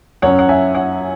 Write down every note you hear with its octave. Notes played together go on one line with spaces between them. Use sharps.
F#2 F#3 C#4 C#5 F#5
F#5
E5 G#5
C#5 F#5